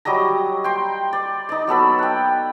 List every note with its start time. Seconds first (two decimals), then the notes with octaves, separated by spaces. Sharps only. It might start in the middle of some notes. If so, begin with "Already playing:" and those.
0.05 F#3 G3 D#5 A#5
0.64 G5 C6
1.13 D5
1.49 D#4 D5
1.67 F#3 B3 A4 B5
1.99 F#5 G5